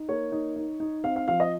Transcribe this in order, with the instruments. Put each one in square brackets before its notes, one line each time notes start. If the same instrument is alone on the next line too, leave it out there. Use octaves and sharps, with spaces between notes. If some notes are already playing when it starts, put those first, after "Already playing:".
Already playing: [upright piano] D#4
A#3 C#5
D#4
D#4
D#4
C4 F5
F5
F3 F5
D#5